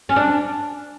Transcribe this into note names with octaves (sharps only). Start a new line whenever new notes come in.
C#4
D4